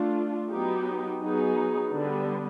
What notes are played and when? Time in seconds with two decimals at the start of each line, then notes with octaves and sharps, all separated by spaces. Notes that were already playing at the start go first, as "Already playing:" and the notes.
Already playing: A3 D4 F4
0.50 F#3 B3 D#4 G4
1.21 F#3 B3 D#4 G#4
1.92 D3 G3 B3 D4